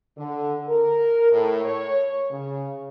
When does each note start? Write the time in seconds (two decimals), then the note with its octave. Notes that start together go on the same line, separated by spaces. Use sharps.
0.17 D3
0.68 A#4
1.32 A2
1.65 C#5
2.31 C#3